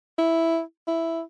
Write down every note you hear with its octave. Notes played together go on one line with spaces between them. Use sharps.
E4
E4